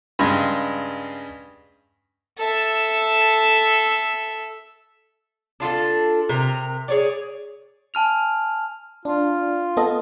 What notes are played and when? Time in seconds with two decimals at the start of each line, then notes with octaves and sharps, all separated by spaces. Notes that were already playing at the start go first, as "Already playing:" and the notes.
0.19 G2 C#3 G#3
2.38 A4 E5
5.60 D4 F4 G4 A4
6.29 C3 A#4
6.88 G#4 C#5 D5
7.94 G#5 A5 F6 F7
9.05 D4 F4
9.77 B3 A4 D#5